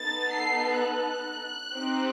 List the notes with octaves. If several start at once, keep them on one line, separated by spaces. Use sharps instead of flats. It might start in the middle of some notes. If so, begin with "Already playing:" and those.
Already playing: B3 D#4 A4 A6
C7
F#6
C4 D#4 G4